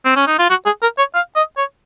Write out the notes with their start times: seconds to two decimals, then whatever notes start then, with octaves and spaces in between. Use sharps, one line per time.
0.05 C4
0.16 C#4
0.27 D#4
0.39 F4
0.50 F#4
0.66 G#4
0.82 A#4
0.98 C#5
1.14 F5
1.36 D#5
1.57 C#5